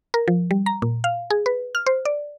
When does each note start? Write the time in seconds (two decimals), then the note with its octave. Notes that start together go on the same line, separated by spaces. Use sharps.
0.14 A#4
0.28 F3
0.51 G3
0.66 A#5
0.82 A#2
1.04 F5
1.30 G#4
1.46 B4
1.75 F6
1.86 C5
2.05 D5